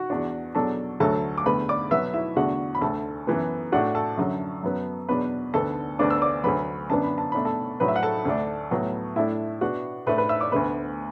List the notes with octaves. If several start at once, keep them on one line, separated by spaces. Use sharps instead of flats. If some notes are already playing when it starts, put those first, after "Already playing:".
Already playing: F#4 F#5
E2 E3 D4
E2 B2 F#3 D4 A4 A5
D2 D3 F#3 A3 A4 A5
D6
E2 D3 A3 B4 B5
D5 D6
B2 F#3 B3 E5 E6
E4 E5
E2 D3 A3 D4 F#4 F#5
B5
D2 D3 A3 A4 A5
F#2 E3 B3
A2 A3 D4 F#4 F#5
A4 A5
F#2 D3 F#3
F#2 F#3 B3
E2 B2 F#3 D4 B4 B5
D2 D3 B3 A4 A5
D2 D3 B3 D4 D6
E6
D5 D6
D2 D3 F#3 B4 B5
F#2 D3 B3 D4 A5
B5
A5
B2 A3 D4 B5
A4 A5
A2 F#3 D4 B4 B5
E5
F#5
A4 A5
D2 D3 A3 D4
A2 F#3 B3
A2 A3 D4 E4 E5
B2 B3 D4 F#4 F#5
A2 A3 D4 B4 B5
B4 B5
E5 E6
D5 D6
D2 D3 B3 B4 B5